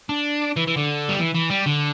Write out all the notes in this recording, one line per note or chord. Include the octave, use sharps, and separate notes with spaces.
D4
E3
E3
D3
G3
E3
E3
G3
D3